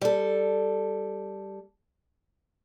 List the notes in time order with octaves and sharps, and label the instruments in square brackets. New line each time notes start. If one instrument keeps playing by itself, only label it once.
[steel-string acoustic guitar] G3 A4